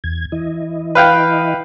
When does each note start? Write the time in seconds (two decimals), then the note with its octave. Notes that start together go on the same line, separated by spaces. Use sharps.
0.04 E2 G#6
0.32 E3 E4 D#5
0.95 B4 F5 G5